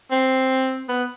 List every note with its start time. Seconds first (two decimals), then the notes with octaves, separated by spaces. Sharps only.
0.12 C4
0.89 B3